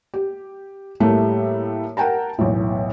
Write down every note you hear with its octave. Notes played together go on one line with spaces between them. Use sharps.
G4
A2 G3 A3 A#3
A#4 F#5 G5 A5 A#5
B1 E2 A2